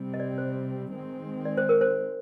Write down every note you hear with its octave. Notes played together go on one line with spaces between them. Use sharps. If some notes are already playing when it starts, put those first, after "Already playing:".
Already playing: C3 G3 C4
D#5
D5
C5
D#3 G#3 C4
D5
C5
A#4
C5